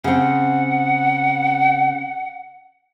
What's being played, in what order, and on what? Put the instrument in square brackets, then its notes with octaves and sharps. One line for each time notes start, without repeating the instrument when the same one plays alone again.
[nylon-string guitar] C#3 C4 [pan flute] F#5